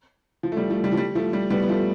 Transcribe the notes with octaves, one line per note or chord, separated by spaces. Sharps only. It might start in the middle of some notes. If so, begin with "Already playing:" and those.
F3
A3
G3
F3 A3
G3
F3
G3
F3 A3
G3
G3 B3
B3
F3 A3